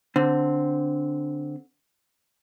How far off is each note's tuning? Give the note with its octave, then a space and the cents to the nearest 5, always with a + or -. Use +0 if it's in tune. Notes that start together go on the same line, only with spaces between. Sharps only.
D3 +0 C4 -5